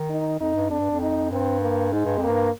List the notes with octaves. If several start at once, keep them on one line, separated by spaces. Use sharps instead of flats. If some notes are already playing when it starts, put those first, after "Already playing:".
Already playing: D#3
D#4
F2 D#4
G2
F2 D4
G2
F2
D#4
G2 C4
A#3
G#2 G#3
G2
F2
A#3
G2